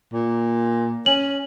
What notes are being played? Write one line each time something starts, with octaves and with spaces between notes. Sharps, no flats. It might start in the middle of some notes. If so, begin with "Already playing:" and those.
A#2
C#4 F#7